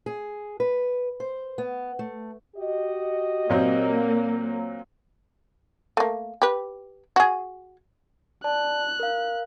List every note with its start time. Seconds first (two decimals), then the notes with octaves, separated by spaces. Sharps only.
0.06 G#4
0.60 B4
1.20 C5
1.58 B3
1.99 A3
2.56 F#4 G4 D#5
3.50 A#2 F#3 A#3 C4
5.97 A3 A#3
6.42 G4 B4
7.16 F#4 G#4
8.44 D5 A5 F#6
9.00 A#4 F5